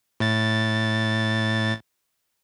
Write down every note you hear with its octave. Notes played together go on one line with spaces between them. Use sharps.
A2 A6